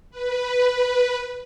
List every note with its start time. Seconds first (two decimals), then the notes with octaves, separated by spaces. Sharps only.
0.11 B4